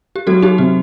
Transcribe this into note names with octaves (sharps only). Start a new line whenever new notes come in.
G4
F#3 F#4 A4
D#4 G4
C3 F#4